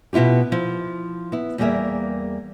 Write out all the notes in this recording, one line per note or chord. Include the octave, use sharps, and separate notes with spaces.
B2 B3 E4 F4 G4
F3 E4
B3 E4
E2 G3 A#3 G#4 A#4 E5